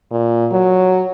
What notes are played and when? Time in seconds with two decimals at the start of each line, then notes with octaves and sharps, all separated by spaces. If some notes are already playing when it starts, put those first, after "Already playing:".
0.11 A#2
0.52 F#3